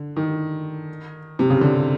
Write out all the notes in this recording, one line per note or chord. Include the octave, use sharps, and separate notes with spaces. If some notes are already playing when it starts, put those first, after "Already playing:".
Already playing: D3
D#3
C3
C#3
D3